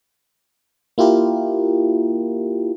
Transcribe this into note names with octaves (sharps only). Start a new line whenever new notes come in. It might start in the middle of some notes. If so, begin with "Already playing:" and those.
A#3 E4 F4 G4 A#4